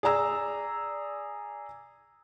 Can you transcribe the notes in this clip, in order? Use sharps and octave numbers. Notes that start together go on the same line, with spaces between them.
G#4 D5 A#5 E6